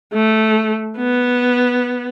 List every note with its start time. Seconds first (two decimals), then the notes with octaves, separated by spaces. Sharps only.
0.13 A3
0.97 B3